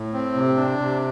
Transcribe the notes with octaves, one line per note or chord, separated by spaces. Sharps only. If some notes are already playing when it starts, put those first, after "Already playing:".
Already playing: A2
C4
C3
D4
C3